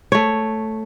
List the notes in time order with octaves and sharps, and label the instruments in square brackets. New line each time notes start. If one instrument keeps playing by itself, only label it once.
[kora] A3 C#5